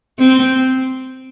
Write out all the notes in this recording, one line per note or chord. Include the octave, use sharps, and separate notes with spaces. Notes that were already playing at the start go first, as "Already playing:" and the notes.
C4